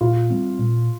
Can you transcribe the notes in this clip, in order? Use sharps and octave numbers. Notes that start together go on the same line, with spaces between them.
A#2 F4
G3 C4
A#2